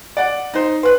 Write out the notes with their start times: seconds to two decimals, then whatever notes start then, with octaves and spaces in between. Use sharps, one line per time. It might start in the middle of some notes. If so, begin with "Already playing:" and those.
0.17 D5 F#5
0.54 D#4 C5
0.83 B4 C6 F#6